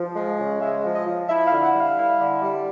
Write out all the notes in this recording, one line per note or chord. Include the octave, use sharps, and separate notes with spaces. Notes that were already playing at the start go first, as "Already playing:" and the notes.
Already playing: F3
G#3
C#3
G#3 E5
F3
D#5
F3
E4 E5
F5
D3
F#5
G3
F5
E4
D3
G3